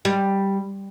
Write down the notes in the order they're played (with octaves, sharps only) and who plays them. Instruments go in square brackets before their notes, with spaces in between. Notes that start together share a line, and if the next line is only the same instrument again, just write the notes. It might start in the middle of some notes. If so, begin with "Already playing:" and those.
[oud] G3